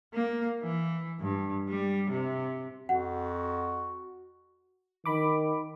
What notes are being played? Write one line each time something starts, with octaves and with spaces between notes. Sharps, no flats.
A#3
E3
G2
G3
C3
F2 F#4 F#5
D#3 B5 D6